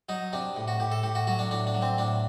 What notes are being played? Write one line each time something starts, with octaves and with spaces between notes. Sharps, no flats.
F#3 D#4
C3 D4
A2
F#4
A2 G4
A4
A2 G4
F#4
F#3 F#4
D4
A2 D4
D4
F#3
C4
A2 D4